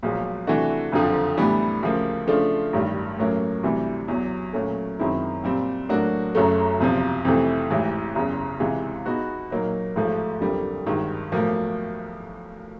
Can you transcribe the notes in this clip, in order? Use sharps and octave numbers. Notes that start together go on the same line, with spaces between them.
B1 A#2 F3 G#3
C3 E3 A3 D4 F#4
F#1 F2 D3 F3
A2 E3 G3 B3 D4
D2 C#3 F3 A#3
C#3 F3 A3 D4 F4
A1 G2 D#3 G3
A2 F#3 A#3 C#4
D2 C3 E3 G3
E2 B2 F#3
A#2 F#3 A3 C#4
F#2 D#3 G#3 C4 E4
A#2 G3 C4
A2 F#3 A#3 D4 F#4
F#1 F#2 C#3 F#3 A3
F#1 E2 C3 F3
F2 C3 E3 A3
A1 G#2 E3
F#1 E2 C#3
C#2 C3 E3 G#3
B2 G#3 B3 D#4 F#4
A#2 F#3 A#3 D#4
A1 G#2 F3 A3
F2 D3 G3 A#3
G#1 G2 D#3 G#3
B1 A2 F3 A#3